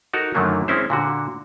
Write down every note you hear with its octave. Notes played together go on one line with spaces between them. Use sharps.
D#4 F#4 A4 A#4
F#2 D3 D#3 F#3 A3 A#3
G#3 C4 C#4 E4 C5
A#2 D3 F#4